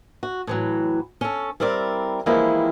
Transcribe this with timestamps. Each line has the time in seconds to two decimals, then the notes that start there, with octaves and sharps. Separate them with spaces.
0.23 F#4
0.47 A2 E3 F#3
1.21 C#4 A4
1.60 G3 C4 E4 A#4 D5
2.26 E3 F3 G3 G#3 A#3 E4